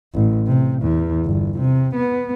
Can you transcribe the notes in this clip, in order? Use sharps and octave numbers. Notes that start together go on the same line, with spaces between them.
A1
C3
E2
G1
C3
B3